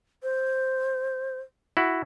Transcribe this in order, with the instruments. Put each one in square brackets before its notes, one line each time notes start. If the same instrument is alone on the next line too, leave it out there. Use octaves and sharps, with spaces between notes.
[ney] C5
[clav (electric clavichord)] E4 F#4